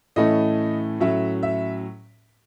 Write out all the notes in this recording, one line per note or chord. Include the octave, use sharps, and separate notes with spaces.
A2 E3 A3 C#4 D#5
A2 F#3 C#4 E5
E5